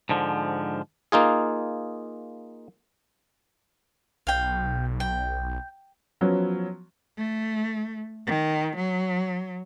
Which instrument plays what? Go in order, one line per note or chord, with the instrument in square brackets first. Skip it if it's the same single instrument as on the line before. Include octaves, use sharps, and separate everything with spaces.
[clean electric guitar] G#2 D3 F3
[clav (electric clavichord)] A#3 D#4 F4 G#4
[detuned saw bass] B1 [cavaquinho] F5 G5
[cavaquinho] G5
[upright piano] F3 F#3 B3 C#4
[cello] A3
D#3
F#3